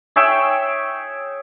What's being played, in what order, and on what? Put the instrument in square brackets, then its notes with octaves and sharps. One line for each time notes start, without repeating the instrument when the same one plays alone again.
[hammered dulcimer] G#4 C#5 E5 G5